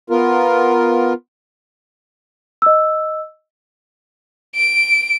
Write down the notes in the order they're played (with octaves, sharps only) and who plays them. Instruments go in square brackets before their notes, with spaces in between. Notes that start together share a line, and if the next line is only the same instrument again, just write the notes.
[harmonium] B3 F4 A#4
[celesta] D#5 E6
[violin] D7